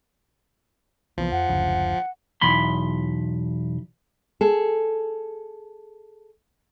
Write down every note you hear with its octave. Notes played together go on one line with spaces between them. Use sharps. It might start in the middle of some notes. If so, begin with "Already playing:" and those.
C2 E3 F3 B3
F2 F#5
F#1 D2 C#3
B1 E2 B5 C6
G#4 A4